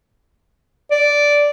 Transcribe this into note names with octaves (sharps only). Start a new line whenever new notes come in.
D5